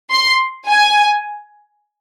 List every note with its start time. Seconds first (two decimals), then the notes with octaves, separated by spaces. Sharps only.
0.11 C6
0.68 G#5